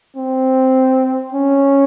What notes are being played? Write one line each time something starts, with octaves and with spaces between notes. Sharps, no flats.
C4
C#4